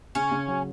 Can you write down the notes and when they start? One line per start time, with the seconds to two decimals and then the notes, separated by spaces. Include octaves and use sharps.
0.15 C#3 C#4
0.31 C#3
0.48 F#3